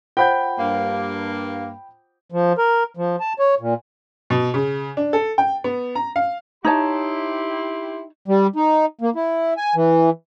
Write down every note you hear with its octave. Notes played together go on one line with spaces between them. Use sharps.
F4 C5 F#5 G5 B5 G6
G2 A#3
F3
A#4
F3
A5
C#5
A#2
B2
C#3
D4
A4
G5
B3
A#5
F5
D#4 E4 G4 C#5 A5 C6
G3
D#4
A#3
E4
G#5
E3